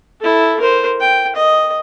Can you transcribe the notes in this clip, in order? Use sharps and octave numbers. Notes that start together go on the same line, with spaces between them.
E4 A4
A#4 C5
G5
D#5